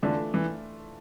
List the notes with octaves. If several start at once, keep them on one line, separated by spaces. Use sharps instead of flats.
D3 E3 A3 D4 F4
E3